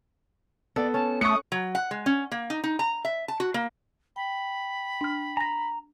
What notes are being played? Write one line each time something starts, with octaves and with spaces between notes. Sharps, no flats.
B3 A4 D5
C#4 A5
A3 F#5 C#6 D#6 C#7
F#3
F#5
G#3
C#4
A#3
D#4
D#4
A#5
E5
A5
F#4
A#3
G5 B5
D4 F6
G#5 A#5 A#6